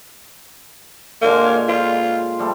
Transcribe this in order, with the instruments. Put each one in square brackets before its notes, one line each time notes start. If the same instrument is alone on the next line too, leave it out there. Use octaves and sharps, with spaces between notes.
[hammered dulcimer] A#2 D3 G#3 [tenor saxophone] A#3
[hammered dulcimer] C#5 F5
[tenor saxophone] F4 [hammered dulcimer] C5
[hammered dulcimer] F3 G3 A3